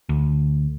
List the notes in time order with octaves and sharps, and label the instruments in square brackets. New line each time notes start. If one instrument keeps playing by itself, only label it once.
[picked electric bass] D2